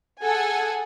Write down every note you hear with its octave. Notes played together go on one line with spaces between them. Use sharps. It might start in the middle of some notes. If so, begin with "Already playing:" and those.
G#4 A4 F#5 G#5